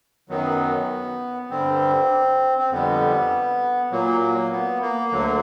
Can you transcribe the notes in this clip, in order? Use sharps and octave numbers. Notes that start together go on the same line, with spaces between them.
F#2 D#3 F#3 B3
G2 D3 G3 C4
C4
F2 D3 G3 B3
A#2 F#3 A#3
A#3
B3
A#3
D2 D3 F#3